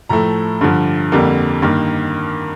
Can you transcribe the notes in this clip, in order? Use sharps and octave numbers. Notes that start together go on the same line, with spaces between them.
A2 F3 A3 A#5
G2 D3 F3
F2 D3 G3 A#3
G2 D#3 A#3